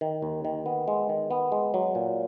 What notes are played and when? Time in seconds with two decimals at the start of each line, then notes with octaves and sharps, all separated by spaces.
0.01 D#3
0.22 D#2
0.45 D#3
0.66 B3
0.88 G#3
1.09 D#3
1.31 B3
1.52 G#3
1.74 F#3
1.95 A#2